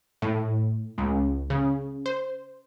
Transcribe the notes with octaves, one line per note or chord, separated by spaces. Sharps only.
A2
C#2
C#3
C5